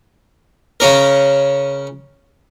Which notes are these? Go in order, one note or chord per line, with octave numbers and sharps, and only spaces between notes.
C#3 C#4 A#4